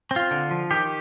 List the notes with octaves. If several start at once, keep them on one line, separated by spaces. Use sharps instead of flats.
C4
F4
D3
F3
D#3 G4